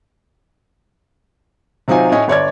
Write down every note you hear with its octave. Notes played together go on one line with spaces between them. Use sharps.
C3 F#3 C4 D#4 F4 G#5
A2 C#4 D#5 G#5
G1 C#5 D5 G#6